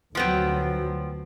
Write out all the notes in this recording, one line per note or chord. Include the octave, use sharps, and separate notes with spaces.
D2 F3 F#3 B3 C4